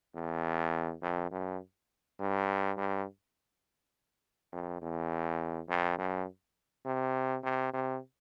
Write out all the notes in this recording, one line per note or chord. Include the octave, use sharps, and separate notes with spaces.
E2
F2
F#2
G2
G2
F2
E2
F2
F#2
C3
C3
C3